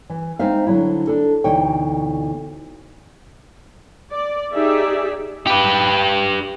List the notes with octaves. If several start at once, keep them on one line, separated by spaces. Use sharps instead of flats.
E3
G#3 C4 D#4 C5 E5 F5
D3 F#3 E4
D4 A4
D2 B2 E3 D#4 C#5 G5
D5
D#4 G4 G#4 D5 E5
G4 B4